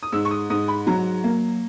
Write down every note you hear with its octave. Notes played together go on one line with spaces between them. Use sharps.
D#6
G#2 E6
C#6
D#6
G#2 D#6
B5
F#3 A#5
A#3